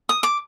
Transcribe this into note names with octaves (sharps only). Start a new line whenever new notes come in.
D#6
D6